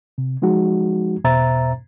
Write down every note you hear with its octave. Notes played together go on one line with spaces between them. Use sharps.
C3
F3 G#3 D#4 F#4
E2 B2 C5 E5 A#5 A6